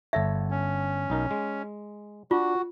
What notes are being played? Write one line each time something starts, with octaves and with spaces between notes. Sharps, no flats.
G1 A4 C#5 E5
C#4
B1 D#4 A#4
G#3
D4 F4 F#4